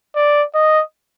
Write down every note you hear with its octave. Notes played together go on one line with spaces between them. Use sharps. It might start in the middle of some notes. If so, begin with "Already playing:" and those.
D5
D#5